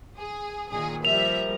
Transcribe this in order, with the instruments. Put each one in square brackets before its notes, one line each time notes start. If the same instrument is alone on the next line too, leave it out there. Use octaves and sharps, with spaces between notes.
[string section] G#4
A#2 D#3 G#4
[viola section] F3 G3 A#4 [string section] E5 [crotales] F7